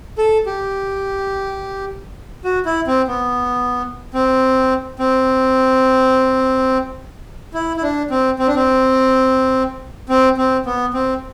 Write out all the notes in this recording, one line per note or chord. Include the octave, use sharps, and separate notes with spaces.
A4
G4
F#4
E4
C4
B3
C4
C4
E4
E4
D4
C4
C4
D4
C4
C4
C4
B3
C4